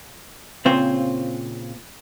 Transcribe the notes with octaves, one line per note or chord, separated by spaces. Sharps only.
A#2 C#3 C4 F4 C5 C#5